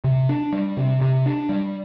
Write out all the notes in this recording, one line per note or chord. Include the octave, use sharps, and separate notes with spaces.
C3
D4
G3
C3
C3
D4
G3